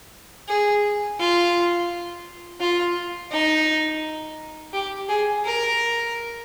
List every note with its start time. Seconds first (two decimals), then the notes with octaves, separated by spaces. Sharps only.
0.48 G#4
1.20 F4
2.60 F4
3.31 D#4
4.73 G4
5.09 G#4
5.45 A#4